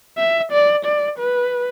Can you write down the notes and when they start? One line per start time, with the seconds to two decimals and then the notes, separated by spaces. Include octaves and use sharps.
0.18 E5
0.52 D5
0.86 D5
1.19 B4